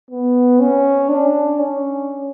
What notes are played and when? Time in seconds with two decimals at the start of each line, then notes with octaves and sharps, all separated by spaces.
0.11 B3
0.60 C#4
1.09 D4
1.59 C#4